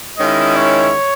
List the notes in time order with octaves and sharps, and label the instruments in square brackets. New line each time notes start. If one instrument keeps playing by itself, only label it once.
[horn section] D#3 G#3 C#4 E4 [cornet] D#5
[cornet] C#5